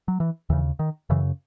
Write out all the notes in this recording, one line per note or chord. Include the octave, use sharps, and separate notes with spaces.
F#3
E3
D#2 C#3 E3
D#3
F#2 C#3 E3